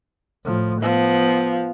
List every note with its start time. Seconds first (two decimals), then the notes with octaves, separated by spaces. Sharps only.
0.45 A2 F3
0.82 F3 B3